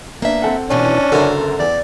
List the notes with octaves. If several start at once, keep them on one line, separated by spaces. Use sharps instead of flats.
A#3 B3 D4 E5
C4 A4 F#5
B2 E3 F3 C#4 D4
F#1 F#2 D3 A4 A#4
E2 D5